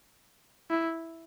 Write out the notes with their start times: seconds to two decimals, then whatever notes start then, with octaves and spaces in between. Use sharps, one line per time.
0.70 E4